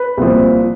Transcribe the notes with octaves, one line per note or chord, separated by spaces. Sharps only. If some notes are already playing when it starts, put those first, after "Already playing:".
Already playing: B4
C2 A#2 F3